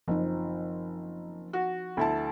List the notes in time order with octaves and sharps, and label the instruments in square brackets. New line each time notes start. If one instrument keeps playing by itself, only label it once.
[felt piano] F#1 [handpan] F3 C4 D#4
[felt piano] F#4
[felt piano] D2 E4 A5 [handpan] A4